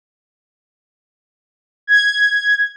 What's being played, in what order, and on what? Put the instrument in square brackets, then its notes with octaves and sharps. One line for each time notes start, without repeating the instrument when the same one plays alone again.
[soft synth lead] G#6